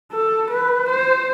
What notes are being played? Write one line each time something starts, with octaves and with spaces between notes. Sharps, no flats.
A4
B4
C5